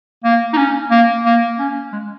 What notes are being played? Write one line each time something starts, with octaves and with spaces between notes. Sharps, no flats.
A#3
D#4
C#4
A#3
A#3
C#4
G#3